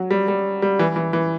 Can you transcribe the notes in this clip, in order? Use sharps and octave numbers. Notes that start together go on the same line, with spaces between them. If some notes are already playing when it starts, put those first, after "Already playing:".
Already playing: F#3
G3
G3
G3
E3
E3
E3